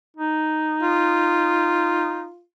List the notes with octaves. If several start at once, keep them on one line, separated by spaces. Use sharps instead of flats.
D#4
F4